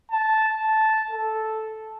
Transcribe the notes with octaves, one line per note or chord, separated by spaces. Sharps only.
A5
A5
A4